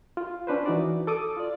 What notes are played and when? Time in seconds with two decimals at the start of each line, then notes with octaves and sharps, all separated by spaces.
0.17 F4
0.47 C#4 D4 B4 C5
0.65 E3 D#4 F#4 D5
1.07 A4 D6 D#6
1.37 F4 D5